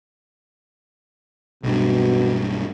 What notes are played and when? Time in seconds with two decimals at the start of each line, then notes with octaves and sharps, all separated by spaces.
1.63 B1 G2 B2